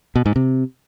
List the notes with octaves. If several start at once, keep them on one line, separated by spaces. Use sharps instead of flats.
B2
G#2
C3